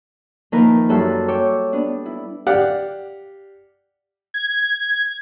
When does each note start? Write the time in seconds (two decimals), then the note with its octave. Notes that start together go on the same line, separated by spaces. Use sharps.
0.52 D#3 F3 A#3 E4 A#4 B4
0.89 F#2 G3 A4 E5 F#5 C6
1.28 C#5 G5 D6 E6
1.73 B3 D4
2.06 E4
2.47 G4 D5 F5 F#5
4.34 G#6